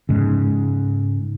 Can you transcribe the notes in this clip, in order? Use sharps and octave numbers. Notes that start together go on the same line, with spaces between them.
G#2 C#3